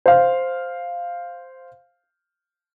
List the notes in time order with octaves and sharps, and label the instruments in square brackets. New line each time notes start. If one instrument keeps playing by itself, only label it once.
[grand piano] C5 F5